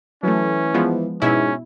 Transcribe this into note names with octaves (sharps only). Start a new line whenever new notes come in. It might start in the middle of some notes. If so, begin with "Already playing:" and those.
E3 F#3 A3 C#4
F3 G#3 B3
G#2 B2 C#4 E4